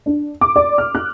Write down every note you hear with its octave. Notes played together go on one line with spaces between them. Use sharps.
D4
D6
D5
F6
F#6